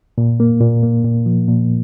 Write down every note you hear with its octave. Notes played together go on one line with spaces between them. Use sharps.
A#2
A#3
A#2
A#3
A#2
F3
A#2